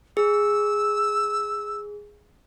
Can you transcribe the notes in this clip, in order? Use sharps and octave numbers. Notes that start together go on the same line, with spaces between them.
G#4 E6